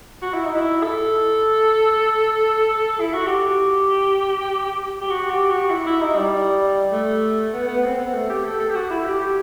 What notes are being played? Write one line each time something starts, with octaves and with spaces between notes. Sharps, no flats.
F#4
E4
D#4
E4
A4
E4
F#4
G4
G4
F#4
G4
F#4
E4
E4
D#4
G3
A3
B3
B3
C4
B3
A3
G4
A4
A4
G4
F#4
E4
G4
G4